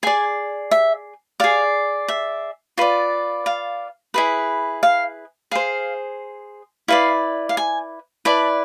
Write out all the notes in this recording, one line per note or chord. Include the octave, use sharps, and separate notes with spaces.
G#4 D5 G#5
E5
G#4 D5 F5
E5
F4 B4 D5
F5
E4 G#4 B4
F5
G#4 C5 F5
E4 B4 D5 F5
F5
G#5
E4 B4 D5 A5